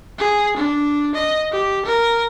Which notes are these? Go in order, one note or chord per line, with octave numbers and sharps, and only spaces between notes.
G#4
D4
D#5
G4
A#4